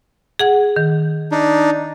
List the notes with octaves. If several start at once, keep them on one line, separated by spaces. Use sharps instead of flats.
G#4 F#5 G#6
D#3
D4 D#4